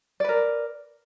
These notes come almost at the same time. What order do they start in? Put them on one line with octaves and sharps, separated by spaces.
D5 B4 A#4